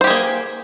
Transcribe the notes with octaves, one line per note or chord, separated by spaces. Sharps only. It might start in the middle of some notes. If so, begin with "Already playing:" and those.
A#3 G4 G#4 C5